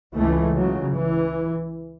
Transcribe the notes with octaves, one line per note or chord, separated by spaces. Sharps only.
C#2 C#3 E3 A3
C#3 F#3
E3